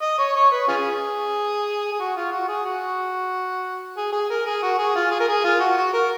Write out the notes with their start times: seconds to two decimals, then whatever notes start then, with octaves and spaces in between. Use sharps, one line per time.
0.02 D#5
0.19 C#5
0.36 C#5
0.52 B4
0.68 C#4 F4 G#4
1.93 G#4
2.00 F#4
2.16 F4
2.32 F#4
2.48 G#4
2.66 F#4
3.97 G#4
4.12 G#4
4.30 A#4
4.46 G#4
4.63 F#4
4.78 G#4
4.96 F4
5.11 G#4
5.20 A#4
5.29 G#4
5.44 F4
5.60 F#4
5.78 F#4
5.93 A#4